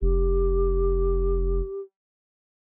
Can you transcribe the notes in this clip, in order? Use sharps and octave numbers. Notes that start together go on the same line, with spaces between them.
F1 G4